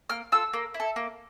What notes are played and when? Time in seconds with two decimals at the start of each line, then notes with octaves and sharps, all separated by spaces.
0.10 A#3 F6
0.32 F4 A4 E6
0.53 A#3
0.74 E4
0.80 A4
0.96 A#3